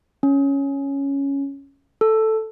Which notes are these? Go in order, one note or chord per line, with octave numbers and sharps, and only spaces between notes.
C#4
A4